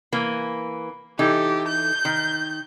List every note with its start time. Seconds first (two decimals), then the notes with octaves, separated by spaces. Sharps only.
0.12 E3 A#3
1.19 E3 D#4 G4 A4
1.68 G6
2.05 D#3